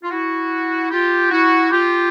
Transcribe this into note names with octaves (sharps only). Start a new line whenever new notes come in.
F4
E4 F#4
F4 G4
E4 F#4
F4 G4